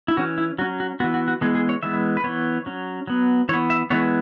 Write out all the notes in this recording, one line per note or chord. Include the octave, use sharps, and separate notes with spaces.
E4
E3 C#4 F#4
E4
F#3 C#4 F#4
F#4
E3 B3 F#4
F#4
F#4
E3 G#3 B3 G#4
G#4
C#5
E3 G#3 B3 E5
B4
E3 B3 C#5
F#3 C#4
F#3 B3
E3 B3 C#5
E5
E3 G#3 B3 C#5